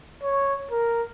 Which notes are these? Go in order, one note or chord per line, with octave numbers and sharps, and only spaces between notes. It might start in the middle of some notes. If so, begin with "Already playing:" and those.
C#5
A#4